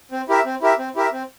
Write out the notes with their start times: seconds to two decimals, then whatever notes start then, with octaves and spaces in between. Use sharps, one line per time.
0.12 C4
0.29 E4 G4 A#4 E5
0.45 C4
0.61 E4 G4 A#4 E5
0.79 C4
0.95 E4 G4 A#4 E5
1.13 C4